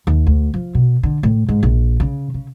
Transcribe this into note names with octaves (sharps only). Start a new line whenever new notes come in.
D#2
D2
F3
B2
D3
A2
G#2
A#1
C#3
C#3